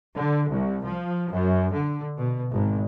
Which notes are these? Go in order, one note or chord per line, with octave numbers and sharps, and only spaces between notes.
D3
C2
F3
F#2
D3
B2
G#1